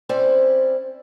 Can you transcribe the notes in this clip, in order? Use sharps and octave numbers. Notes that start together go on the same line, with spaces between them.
C4 C#4 E4 C5 D5